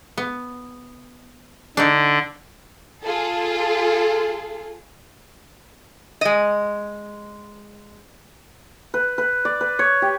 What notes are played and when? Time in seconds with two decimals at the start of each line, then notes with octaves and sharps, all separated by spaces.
0.18 B3
1.77 D3 D4 D#4 D5
3.04 F4 G#4 A4
6.21 G#3 D#5
8.94 B4
9.18 B4
9.45 D5
9.61 B4
9.79 C#5
10.02 G4